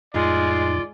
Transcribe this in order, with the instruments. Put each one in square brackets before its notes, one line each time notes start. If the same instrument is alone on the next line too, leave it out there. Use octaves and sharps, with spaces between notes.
[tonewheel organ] F2 A2 D#4 [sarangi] G#3 [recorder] F4 [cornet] D5